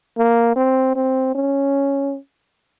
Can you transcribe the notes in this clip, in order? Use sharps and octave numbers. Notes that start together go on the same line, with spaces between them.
A#3
C4
C4
C#4